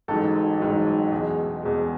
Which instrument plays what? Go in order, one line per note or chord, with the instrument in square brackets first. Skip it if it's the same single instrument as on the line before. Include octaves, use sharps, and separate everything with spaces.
[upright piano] A1 G#2 F#3 A4
A1 G#2 F#3
E2 B2 G#3
E2 B2 G#3